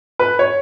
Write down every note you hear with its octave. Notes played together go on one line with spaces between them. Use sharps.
B4
C#5